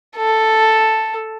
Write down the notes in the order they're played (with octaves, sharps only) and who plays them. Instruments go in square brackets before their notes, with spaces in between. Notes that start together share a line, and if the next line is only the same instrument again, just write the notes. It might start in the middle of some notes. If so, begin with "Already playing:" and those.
[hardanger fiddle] A4